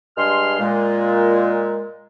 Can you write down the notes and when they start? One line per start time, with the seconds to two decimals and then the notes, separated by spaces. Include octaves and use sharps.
0.17 G2 G#3 C6 F6
0.59 A#2 G#3